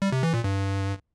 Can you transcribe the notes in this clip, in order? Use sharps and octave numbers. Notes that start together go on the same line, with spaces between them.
G3
C3
E3
A#2
G2